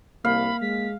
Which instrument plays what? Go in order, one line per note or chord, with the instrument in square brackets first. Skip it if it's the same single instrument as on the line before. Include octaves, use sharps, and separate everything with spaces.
[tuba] C2 [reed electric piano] A#3 [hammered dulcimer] F5 [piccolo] B5
[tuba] G#3 [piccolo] B6